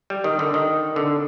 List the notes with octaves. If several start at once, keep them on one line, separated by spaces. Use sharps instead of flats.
G3
D#3
D3
D#3
D3